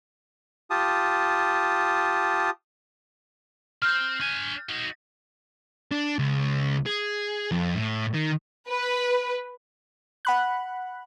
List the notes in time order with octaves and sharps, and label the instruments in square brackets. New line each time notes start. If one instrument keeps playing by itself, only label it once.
[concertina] F4 G4 A5 D#6
[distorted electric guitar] C4 [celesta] F6 G6
[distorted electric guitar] D4 G#5
D#4 F#4
D4
C#2
G#4
F2
A2
D#3
[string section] B4
[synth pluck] F#5 B5 F#6